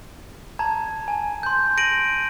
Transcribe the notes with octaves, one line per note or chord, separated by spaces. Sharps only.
A5 A#5 G#6
G#5 A5
C6 G6
A#6 D7 D#7 F#7